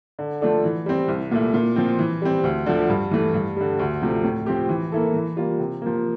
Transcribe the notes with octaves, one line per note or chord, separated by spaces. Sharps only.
D3
F3 A3 D4 A4
E3
G3 C4
C2
A#2 A3 E4
A#2
F3 C4
E3
G3 C4
D2
D3 F3
G2
E3 A3
G2
D3 G3
D2
C3 F3 A3
A2
F3 C4 G4
E3
A#3 E4 A4
E3
G3 A#3 F4
C3
F3 A#3